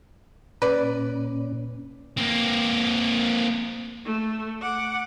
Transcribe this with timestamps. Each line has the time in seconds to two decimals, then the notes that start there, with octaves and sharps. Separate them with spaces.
0.62 A#2 C#4 B4 D5
2.17 A#3 C4
4.05 A3
4.62 F#5 D6